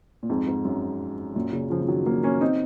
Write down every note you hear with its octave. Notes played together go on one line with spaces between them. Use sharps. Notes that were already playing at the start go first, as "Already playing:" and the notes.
A#2
F2 G#2
F2 G#2
F#2
F#2 A#2
A#2 C#3
C#3 F3
F3
D#3 F#3
F#3 A#3
A#3 C#4
C4 D#4